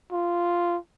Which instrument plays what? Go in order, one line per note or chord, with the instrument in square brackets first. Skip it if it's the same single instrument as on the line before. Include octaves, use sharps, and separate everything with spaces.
[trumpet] F4